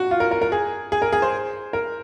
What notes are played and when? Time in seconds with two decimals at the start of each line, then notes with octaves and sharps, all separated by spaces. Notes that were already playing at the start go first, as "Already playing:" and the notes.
Already playing: F#4
0.11 F4
0.20 A#4
0.31 A#4
0.42 A#4
0.52 G#4
0.92 G#4
1.02 A#4
1.13 G#4
1.22 C5
1.73 A#4